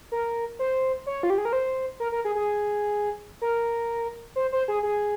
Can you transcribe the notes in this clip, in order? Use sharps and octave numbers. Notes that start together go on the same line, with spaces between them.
A#4
C5
C#5
F4
G4
G#4
A#4
C5
A#4
A#4
G#4
G#4
A#4
C5
C5
G#4
G#4